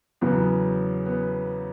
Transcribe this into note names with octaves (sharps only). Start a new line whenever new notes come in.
E2 C#3 F#3 B3
B3